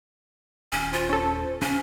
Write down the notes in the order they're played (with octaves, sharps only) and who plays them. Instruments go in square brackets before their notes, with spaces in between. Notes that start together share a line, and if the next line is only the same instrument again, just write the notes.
[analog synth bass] D#1 [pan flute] C#4
[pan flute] F4 [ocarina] C5
[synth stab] C#4 A4
[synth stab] C#3 [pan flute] C#4